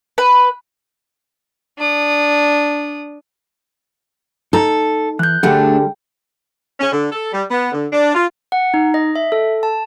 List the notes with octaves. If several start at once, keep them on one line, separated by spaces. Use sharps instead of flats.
B4
D4 D#6
D#4 A4 A#5
E3 F#6 G6
D2 D3 G3 A3 D4 G#4 F#5 G5
C#4
D3
A4
G3
B3
D3
D4
F4
F#5
D#4
D#5
E5
A4
A5